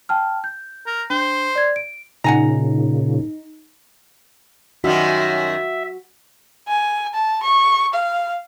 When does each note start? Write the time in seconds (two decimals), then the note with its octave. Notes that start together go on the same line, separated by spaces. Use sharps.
0.09 G5 A5 F6
0.44 G6
0.87 A#4
1.10 D4 C5 G7
1.55 D5 G#6
1.76 D7
2.24 A#2 C#3 D#4 F#5 G#5 A#5
4.84 F#2 D#3 G3 F#4 E5
6.68 G#5
7.14 A5
7.42 C#6
7.94 F5